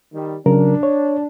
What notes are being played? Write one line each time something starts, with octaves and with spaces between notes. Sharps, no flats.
D#3 G3
C#3 F#3 D4 A#4
C#5